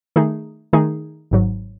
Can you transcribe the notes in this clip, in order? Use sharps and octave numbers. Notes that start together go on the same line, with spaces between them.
D#3 A3 D#4 G#4
D#3 A3 D#4 G#4
G#1 G#2 F#3